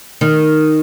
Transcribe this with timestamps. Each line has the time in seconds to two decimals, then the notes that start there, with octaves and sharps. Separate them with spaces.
0.21 D#3